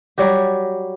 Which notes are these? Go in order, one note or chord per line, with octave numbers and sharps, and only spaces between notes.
F#3 G3 F#4 G4